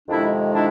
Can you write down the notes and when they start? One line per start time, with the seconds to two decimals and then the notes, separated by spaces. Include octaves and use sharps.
0.08 F2 C3 D#3 G#3 D4 E4
0.53 D4 E4